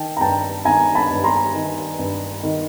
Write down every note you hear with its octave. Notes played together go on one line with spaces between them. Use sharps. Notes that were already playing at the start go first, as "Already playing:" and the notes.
Already playing: D#3 G5 A5
A#5
G2 G5 A5
D#3 G#5 A#5
A5 B5
G2
A#5 C6
D#3
G2
D#3